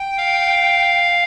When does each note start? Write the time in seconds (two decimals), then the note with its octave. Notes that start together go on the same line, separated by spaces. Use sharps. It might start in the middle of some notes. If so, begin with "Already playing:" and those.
Already playing: G5
0.18 F5